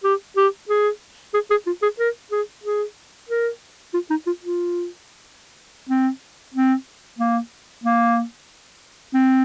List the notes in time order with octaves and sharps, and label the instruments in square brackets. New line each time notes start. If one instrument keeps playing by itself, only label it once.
[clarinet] G4
G4
G#4
G#4
G#4
F4
G#4
A#4
G#4
G#4
A#4
F4
D#4
F4
F4
C4
C4
A#3
A#3
C4